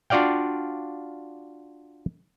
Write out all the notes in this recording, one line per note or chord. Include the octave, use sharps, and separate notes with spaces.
D4 F4 F#4 D5 F5 G5